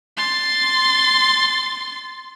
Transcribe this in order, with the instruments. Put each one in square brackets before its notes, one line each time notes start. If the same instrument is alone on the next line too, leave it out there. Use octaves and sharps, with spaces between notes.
[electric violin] C6 A6